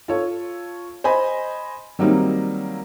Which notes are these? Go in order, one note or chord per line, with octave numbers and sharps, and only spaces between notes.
F4 A4 C#5
C5 D#5 G#5 B5
D#3 F#3 G3 A#3 C4 D#4